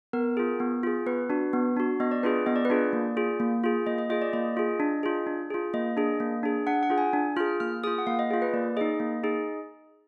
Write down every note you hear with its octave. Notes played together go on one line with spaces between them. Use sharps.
B3 A#4
F4 G#4
B3
F4 G#4
B3 B4
D4 F#4
B3
D4 F#4
B3 D#5
D5
D4 F4 G#4 B4
B3 D#5
D5
B4
D4 F4 G#4 D5
A#3
F4 G#4
A#3
F4 G#4
A#3 D#5
D#5
F4 G#4 D#5
D5
A#3 D#5
F4 G#4
D4
F4 G#4
D4
F4 G#4
A#3 D#5
D4 G#4
A#3
D4 G#4
D4 F#5
F#5
F4 G#4
G#5
D4
F4 G#4 F6
A#3 F6
F4 G#4 D#6
F#5
A#3 F5
D#5
F4 G#4
B4
A#3 D5
D#4 G#4 D#5
A#3
D#4 G#4